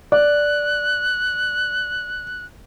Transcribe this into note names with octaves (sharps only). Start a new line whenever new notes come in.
D5 F#6